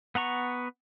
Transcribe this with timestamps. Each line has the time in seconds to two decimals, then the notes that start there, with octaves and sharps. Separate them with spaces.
0.15 B3 F#5 A#5 C#6